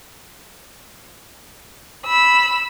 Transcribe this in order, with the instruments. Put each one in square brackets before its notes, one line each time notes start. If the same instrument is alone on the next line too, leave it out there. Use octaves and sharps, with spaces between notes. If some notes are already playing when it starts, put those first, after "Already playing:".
[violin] B5 E6